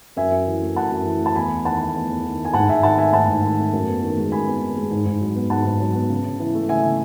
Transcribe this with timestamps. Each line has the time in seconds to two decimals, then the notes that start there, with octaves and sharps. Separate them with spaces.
0.16 F#2 E5 G#5
0.32 F#2
0.47 E3
0.61 A3
0.76 F#2 F#5 A5
0.91 F#2
1.05 E3
1.21 A3 A5
1.35 E2 G#5 B5
1.50 E2
1.65 D#3 F#5 A5
1.80 A3
1.94 E2
2.10 E2
2.25 D#3
2.39 A3
2.45 G#5
2.54 G#2 F#5 A5
2.69 G#2 E5 G#5
2.83 D#3 F#5 A5
2.98 A3 E5 G#5
3.13 G#2 F#5 A5
3.28 G#2
3.43 D#3
3.58 A3
3.73 F#2
3.88 B3
4.02 D#3
4.17 G#3
4.32 F#2 G#5 B5
4.47 B3
4.61 D#3
4.76 G#3
4.91 G#2
5.06 G#2
5.21 F#3
5.35 B3
5.50 G#2 F#5 A5
5.65 G#2
5.80 F#3
5.95 B3
6.09 C#3
6.25 C#3
6.39 E3
6.54 A3
6.69 C#3 E5 G#5
6.84 C#3